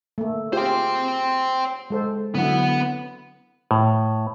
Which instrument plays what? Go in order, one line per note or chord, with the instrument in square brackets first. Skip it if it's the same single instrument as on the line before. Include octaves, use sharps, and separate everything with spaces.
[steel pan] A3 A#3
[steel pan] F4 G4 G#4 [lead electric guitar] C5 G5
[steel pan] G#3 A4 C5
[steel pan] D3 F#3 E4 [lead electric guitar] B3 F#5
[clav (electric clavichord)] A2